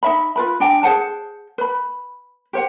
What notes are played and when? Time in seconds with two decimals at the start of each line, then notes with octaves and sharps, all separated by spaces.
0.03 D#4 E5 B5
0.36 F4 B4 B5
0.60 D4 G5 G#5
0.83 G#4 C5 F#5 A5
1.58 B4 B5
2.53 G4 C5 F#5